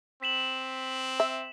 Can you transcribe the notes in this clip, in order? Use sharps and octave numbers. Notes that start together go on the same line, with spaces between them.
C4 B6 E7 F#7
E5